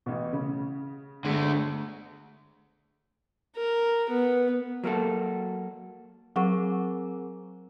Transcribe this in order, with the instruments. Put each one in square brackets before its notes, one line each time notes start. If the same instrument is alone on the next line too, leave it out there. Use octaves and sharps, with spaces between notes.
[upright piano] A1 B2
C#3
[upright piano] G1 G#3 B6 [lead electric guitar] D3 A3
[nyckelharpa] A#4
B3
[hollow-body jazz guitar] F#3 A#3 F#4 A4
[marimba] F#3 F#5 C#6 [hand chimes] C4 G#4 A#4